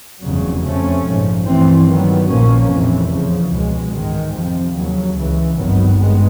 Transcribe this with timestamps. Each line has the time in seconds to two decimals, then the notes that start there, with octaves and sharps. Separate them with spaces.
0.24 F1 E2 C#3 F#3
0.65 F2 C3 F3 A3 C#4
1.05 A#1 G#2 F3
1.46 G2 E3 A3 C4
1.88 G2 D#3 F#3 B3
2.28 A#1 A#2 F3 A#3 C#4
2.70 F1 F2 C3 E3
3.11 E2 C#3 F3
3.51 C#2 B2 G#3
3.93 A1 G#2 D#3 G#3
4.34 F2 C3 F3
4.75 D#2 C#3 F#3
5.16 C#2 C#3 E3
5.57 G#1 G2 D#3 F#3 B3
5.97 G2 D#3 G#3 B3